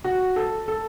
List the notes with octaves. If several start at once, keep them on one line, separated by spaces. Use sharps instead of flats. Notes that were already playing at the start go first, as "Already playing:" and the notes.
F#4
A4
A4